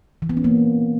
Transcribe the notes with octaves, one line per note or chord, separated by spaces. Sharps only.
E3
B3
C#4
A#3